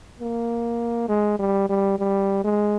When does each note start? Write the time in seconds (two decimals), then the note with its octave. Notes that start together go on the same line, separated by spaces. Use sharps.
0.20 A#3
1.08 G#3
1.39 G3
1.69 G3
1.99 G3
2.44 G#3